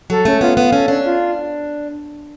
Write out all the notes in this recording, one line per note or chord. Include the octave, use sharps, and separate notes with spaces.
F#3 A4
A3 C#4
B3 F4
B3 F5
C#4 A4
C#4 D4
F4